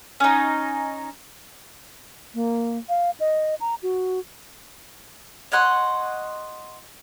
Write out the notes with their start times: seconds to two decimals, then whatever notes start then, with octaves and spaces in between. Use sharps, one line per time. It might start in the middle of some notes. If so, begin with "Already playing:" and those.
0.20 C#4 D#4
2.33 A#3
2.89 F5
3.20 D#5
3.61 A#5
3.83 F#4
5.52 C#5 D#5 F#5 C6